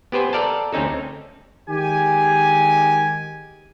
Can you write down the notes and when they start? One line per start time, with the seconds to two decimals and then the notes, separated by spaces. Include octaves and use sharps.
0.12 B3 G4 B4 C5 G#5
0.33 A4 A#4 D5 F5 G5 A5
0.72 D2 C4 C#4 D#4 A4
1.69 D#3 G#3 G4 G#5